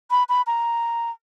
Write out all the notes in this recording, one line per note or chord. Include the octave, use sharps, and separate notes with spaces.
B5
B5
A#5